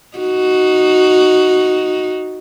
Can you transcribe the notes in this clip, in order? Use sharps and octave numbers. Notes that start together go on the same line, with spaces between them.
D#4 F#4